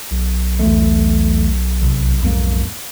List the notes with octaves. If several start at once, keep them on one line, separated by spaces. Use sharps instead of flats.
B1
E2 A3
C2
F2 G#2 A#3